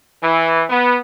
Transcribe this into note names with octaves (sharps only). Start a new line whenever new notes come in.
E3
B3